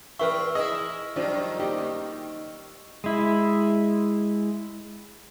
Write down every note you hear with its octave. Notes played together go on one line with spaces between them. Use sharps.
E2 C4 B4 E5 C#6 E6 F6
E4 G#4 D#5
F#2 D#3 F3 G3 D4
A#3 D#4 G4 D#5
D#4
G#3 E4